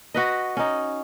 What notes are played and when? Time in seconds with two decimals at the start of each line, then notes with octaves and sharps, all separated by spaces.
0.14 F#4 B4 D#5
0.57 C#4 D#4